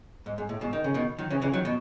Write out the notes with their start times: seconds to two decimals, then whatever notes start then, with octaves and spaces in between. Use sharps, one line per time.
0.26 G#2
0.38 G#2
0.49 A2
0.61 G#2 B2
0.73 D#3
0.84 C#3
0.94 B2 D#3
1.19 D#3 F#3
1.30 C#3 E3
1.42 C#3 E3
1.53 D#3 F#3
1.65 B2